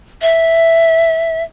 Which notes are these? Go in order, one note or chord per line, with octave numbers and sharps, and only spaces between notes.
E5